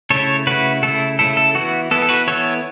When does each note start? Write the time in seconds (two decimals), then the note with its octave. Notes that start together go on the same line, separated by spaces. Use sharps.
0.10 C#3 A3 E4 A4 C#5
0.47 C#3 A3 E4 F#4 B4
0.83 C#3 A3 E4 A4
1.19 C#3 A3 E4 A4
1.37 A4
1.55 E3 B3 E4 F#4
1.91 E3 B3 E4 A4
2.02 A4
2.09 F#4 B4
2.27 E3 B3 E4 A4 C#5